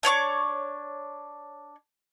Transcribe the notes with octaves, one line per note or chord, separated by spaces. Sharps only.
D4 C#5 C#6 D6